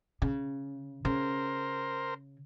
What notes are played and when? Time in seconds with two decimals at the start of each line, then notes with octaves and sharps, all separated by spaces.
0.22 C#3
1.05 C#3 A#4 C5